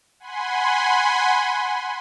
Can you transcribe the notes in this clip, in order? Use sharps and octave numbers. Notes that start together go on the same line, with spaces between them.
F#5 G#5 B5 C6